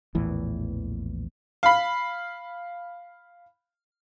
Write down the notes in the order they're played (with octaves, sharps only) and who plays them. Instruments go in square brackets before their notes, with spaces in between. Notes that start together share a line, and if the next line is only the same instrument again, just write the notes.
[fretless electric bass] A#1 E2 A2 E3
[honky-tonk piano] F5 B5